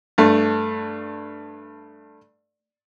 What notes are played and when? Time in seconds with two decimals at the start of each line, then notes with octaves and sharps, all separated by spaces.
0.18 G2 A3